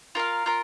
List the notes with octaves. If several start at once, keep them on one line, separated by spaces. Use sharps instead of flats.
F4 A#4 F5
F4 A#4